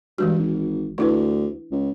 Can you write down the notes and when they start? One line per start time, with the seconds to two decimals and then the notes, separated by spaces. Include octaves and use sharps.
0.18 G2 E3 G#3 F#4
0.38 G#1
0.98 D2 D4 E4 B4
1.71 C#2